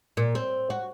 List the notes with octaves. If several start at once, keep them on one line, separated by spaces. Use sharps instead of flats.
A#2
C4
F#4